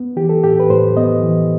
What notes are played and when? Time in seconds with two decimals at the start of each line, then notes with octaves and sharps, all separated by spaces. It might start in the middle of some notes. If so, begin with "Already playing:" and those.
Already playing: B3
0.16 E3 G4
0.29 A4
0.44 A2 G4
0.60 B4
0.70 A2 C5
0.97 B3 D#5
1.23 E3